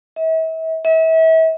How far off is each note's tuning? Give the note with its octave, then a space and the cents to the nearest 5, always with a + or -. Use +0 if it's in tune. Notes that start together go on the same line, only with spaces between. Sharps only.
E5 -40
E5 -35